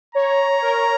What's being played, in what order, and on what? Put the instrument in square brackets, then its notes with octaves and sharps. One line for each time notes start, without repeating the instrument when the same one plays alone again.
[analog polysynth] C#5 [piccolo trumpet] A#5
[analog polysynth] A#4